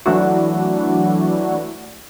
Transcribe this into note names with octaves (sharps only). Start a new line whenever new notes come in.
E3 F#3 A3 D4 E4 F#4